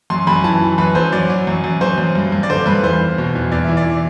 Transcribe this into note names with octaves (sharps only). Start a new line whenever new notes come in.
F#2 C6
F#2 B5
E3 A5
E3
F#2 B4
F#2 C5
F#3 D5
F#3
F#2
F#2
F#2 C5
F#2
G2
G2
D5
D3 C5
G2 B4
E2 C5
E2
B2
E2
E2 D5
E3 E5
D5
E3